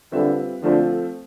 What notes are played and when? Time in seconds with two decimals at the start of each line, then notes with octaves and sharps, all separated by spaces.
0.12 D3 G3 C4 F4 B4 E5
0.62 D3 F3 A3 C4 F4